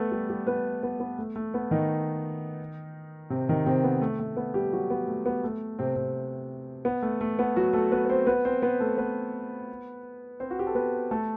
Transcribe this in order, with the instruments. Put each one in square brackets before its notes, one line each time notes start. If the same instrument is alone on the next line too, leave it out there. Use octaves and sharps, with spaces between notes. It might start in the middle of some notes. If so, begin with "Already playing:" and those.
Already playing: [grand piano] A3 B3 A4 B4
G3 G4
G3 G4
B3 B4
B3
B3
A3
A3
B3
D#3 D#4
C3 C4
D#3 D#4
C3 C4
B3
A3
A3
B3
G3 G4
F#3 F#4
B3
A3
B3
A3
C3 C4
C3 C4
B3
A3
A3
B3
F#3 F#4
A3 A4
B3 B4
B4
C4 C5
B3 B4
C4 C5
B3 B4
A3 A4
B3 B4
C4 C5
F#4
G4
A4
B3 B4
A3 A4